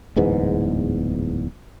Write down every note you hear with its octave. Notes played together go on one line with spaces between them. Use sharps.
D1 E2 G#2 B3